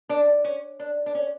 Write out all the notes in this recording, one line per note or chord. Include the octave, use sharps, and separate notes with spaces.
D4
C#4
D4
D4
C#4